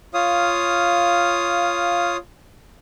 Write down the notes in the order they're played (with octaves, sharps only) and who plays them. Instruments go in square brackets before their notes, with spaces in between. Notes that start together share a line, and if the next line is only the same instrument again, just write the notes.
[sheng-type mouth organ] F4 C#5 F5 D#6